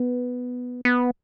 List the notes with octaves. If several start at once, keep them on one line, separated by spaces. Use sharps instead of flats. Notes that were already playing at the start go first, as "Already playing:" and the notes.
Already playing: B3
B3